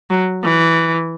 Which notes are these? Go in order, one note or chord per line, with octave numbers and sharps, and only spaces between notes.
F#3
E3